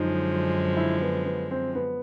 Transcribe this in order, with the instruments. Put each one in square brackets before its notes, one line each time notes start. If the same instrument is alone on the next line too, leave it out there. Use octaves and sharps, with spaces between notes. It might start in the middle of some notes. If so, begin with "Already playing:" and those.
Already playing: [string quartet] F#2 D3 F3 G#3 [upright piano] D#4
[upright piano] E4
B3
B3
C4
B3